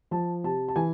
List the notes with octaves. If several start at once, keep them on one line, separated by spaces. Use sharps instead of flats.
F3 A5
C3 A5
A5
E3 G#5